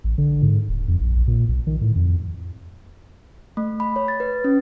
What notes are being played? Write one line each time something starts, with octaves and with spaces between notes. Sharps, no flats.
A1
D3
G#2
D#1
F2
A#1
A#1
A#2
B1
D#3
A2
F2
A3
B5
C#5
A6
B4
C#4